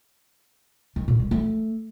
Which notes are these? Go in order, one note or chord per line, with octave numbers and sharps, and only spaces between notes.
D#3
A#2
G#3
A3